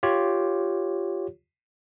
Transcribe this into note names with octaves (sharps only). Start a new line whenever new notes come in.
F4 G4 C#5